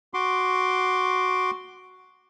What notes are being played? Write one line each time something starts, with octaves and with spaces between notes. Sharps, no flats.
F#4 C6 D6